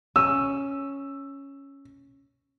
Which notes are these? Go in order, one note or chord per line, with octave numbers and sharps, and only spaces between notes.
C#4 E6